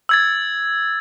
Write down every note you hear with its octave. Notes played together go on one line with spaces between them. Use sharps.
E6 G#6 A6